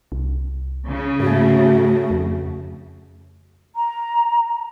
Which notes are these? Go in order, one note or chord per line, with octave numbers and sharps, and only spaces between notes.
C2
C#3
G#2 A3 F#4
F2
A#5